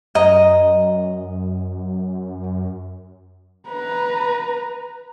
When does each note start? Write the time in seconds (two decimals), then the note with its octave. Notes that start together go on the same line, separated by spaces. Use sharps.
0.15 F#2 D#5 A#5
3.68 B4 A#5